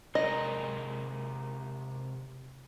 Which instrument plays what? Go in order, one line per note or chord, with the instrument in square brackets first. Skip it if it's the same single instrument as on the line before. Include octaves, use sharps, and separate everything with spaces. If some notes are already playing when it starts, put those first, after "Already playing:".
[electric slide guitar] C3 G#3 A#4 [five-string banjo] D#5